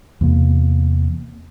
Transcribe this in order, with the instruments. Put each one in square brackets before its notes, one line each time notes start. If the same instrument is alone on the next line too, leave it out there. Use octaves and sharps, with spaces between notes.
[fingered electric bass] E2 C3 A#3